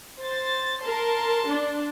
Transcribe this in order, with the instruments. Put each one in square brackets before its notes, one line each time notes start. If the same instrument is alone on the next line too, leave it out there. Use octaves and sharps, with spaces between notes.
[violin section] C5 A6
[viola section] A#4 [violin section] A5 C6
[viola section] D4